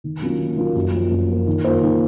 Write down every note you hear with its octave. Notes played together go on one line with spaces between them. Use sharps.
D#3
F#3 A#3 C#4 F4
D#3
F#3 A#3 C#4 F4
F#2
F3 A#3
F#2
F3 A#3
D#3
A#3 F4 C5
D#3